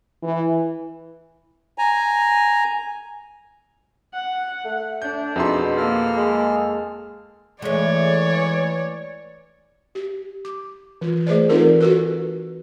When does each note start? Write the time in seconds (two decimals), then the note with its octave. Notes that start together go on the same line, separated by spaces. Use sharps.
0.23 E3
1.78 G#5 A#5
4.13 F#5
4.65 A3
5.02 D4 G6
5.36 F2 B2 D#4 G#4 A4 C6
5.77 A#3 A4 F6
6.17 G#3
7.62 E3 G#3 A3 C#5 D5
9.95 G4
10.45 D6
11.01 E3 F4
11.27 A3 G#4 B4 C5 D5
11.49 E3 C4 D#4 F4 A4 A#4
11.80 F#4 A4 B4